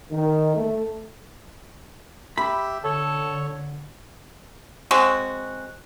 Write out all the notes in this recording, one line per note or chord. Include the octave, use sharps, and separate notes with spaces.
D#3
A3
G4 E5 B5
D3 A4 C#5
G#3 C4 F#4